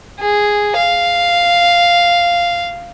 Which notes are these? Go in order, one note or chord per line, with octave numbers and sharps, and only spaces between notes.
G#4
F5